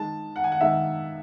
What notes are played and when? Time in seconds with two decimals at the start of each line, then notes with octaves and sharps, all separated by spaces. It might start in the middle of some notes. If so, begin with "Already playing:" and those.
Already playing: D#3 G#3 A5
0.36 F#5
0.44 G#5
0.52 F#5
0.61 D#3 G#3 E5